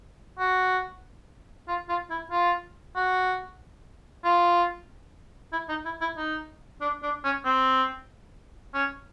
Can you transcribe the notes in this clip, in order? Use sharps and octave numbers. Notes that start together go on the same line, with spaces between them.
F#4
F4
F4
E4
F4
F#4
F4
E4
D#4
E4
E4
D#4
D4
D4
C#4
C4
C#4